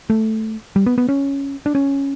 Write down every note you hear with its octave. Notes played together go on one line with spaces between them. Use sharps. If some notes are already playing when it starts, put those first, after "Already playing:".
A3
G3
B3
B3
C#4
D4
C#4